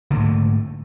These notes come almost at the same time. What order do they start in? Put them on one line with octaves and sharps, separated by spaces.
D3 A#3 G#2 A3